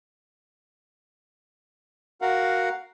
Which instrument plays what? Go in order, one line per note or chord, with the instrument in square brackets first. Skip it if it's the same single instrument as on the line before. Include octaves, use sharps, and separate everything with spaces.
[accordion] F#4 A#4 F5 F#5